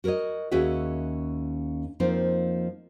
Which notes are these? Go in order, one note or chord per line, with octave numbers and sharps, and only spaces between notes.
F#4 A#4 B4 C#5 D#5
D#2 C#4 F#4 G#4 E5
F2 F3 A#3 C4 D#4